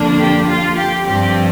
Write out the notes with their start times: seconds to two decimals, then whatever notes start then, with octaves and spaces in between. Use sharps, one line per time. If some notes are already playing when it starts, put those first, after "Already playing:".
Already playing: F2 D3 A#3 D4
0.19 G4
0.48 F4
0.77 G4
1.06 G2 F3 C4 G4